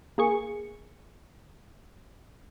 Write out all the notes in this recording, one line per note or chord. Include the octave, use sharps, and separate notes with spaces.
A#3 G#4 C#6